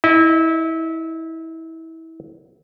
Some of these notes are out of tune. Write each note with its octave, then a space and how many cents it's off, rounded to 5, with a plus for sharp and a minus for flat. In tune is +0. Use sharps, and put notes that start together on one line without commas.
E4 -25 D#5 +0